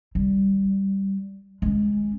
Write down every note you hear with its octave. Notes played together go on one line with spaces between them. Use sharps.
G3
G#3 C#4